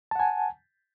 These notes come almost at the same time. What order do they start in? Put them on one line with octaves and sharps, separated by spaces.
A5 F#5 G#5